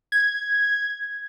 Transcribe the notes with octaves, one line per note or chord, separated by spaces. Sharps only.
G#6